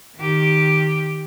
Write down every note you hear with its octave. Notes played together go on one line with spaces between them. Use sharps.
D#3 G4